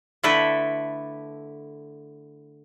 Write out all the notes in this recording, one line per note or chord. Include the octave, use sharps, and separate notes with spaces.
D3 A3 E4 A4 B4